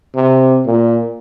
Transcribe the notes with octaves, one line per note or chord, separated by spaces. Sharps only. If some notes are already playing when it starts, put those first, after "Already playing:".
C3
A#2